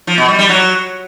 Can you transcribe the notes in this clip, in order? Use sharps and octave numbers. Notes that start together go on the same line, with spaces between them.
F3
B2
G3
G3
F#3